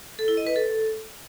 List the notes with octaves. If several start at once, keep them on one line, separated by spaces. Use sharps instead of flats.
A4
E4
D#5
B4
A4